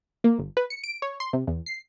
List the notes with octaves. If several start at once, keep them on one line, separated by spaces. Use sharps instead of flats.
A#3
G1
B4
C#7
D7
C#5
C6
C3
E2
C7